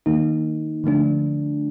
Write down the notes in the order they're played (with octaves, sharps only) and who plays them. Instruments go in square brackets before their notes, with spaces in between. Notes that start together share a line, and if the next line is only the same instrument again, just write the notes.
[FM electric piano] D#3 A#3 D#4
D3 F3 A3 D4